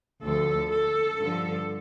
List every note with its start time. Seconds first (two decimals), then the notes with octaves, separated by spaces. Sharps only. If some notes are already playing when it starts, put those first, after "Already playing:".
0.23 D2 D3 F3 A4
0.71 A4
1.19 G2 D3 F3